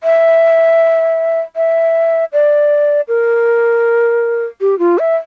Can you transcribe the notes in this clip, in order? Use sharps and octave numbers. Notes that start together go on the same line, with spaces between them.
E5
E5
D5
A#4
G4
F4
E5